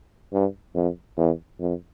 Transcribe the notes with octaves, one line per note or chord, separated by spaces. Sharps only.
G2
F2
E2
F2